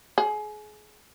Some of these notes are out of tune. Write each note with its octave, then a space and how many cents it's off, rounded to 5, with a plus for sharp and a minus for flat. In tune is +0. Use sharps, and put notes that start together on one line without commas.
G#4 +30